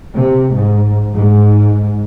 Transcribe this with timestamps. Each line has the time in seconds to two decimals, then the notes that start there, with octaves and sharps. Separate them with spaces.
0.15 C3
0.54 G#2
1.15 G#2